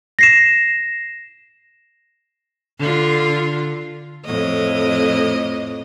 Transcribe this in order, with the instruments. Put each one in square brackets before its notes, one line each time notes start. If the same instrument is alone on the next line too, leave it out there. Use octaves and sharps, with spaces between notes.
[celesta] A#6 C7 E7
[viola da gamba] D3 F4
F2 A2 D#5